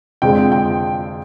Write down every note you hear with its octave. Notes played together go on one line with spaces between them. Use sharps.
F2 D3 G#3 C4 G5
G5